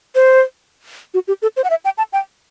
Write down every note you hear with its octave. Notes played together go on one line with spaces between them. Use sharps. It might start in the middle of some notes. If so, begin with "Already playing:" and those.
C5
F#4
G4
A4
C5
F#5
E5
G5
A5
G5